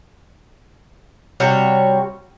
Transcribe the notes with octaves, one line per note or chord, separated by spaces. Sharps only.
C3 G3 F#4 C#5